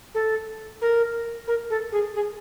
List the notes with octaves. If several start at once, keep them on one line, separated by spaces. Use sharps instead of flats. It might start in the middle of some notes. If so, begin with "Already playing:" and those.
A4
A#4
A#4
A4
G#4
G#4